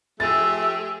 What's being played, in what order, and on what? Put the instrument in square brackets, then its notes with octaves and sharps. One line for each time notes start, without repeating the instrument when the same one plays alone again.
[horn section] F3 A3 [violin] G4 G#4 [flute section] E6 [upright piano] A6